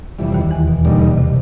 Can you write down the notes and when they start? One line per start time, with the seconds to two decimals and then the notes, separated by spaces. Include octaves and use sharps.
0.19 F2 C3 E3 G3
0.34 D#2 D#3
0.51 E2 E3
0.68 B2
0.85 G2 B2 D3 G3 A#3 D#4
1.02 C3
1.17 C3